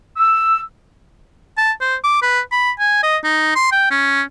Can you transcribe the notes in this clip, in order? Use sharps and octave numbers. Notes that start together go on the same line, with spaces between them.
E6
A5
C5
D6
B4
B5
G#5
D#5
D#4
C6
G5
C#4